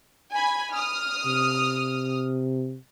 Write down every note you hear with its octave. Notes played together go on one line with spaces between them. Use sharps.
G#5 B5 G#6
D#6 F6
C3